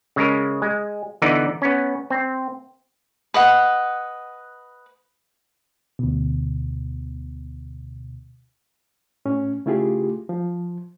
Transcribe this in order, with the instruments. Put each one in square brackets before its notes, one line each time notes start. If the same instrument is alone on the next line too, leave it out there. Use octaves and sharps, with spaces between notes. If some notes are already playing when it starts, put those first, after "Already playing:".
[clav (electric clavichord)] C#3 G#3 A#4
G#3
D3 E3 B3 D#4 D5
B3 C#4
C4
[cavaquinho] B4 D#5 F#5
[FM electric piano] D2 B2
[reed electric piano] A2 C#4
C#3 A3 E4 F4 G4 G#4
F3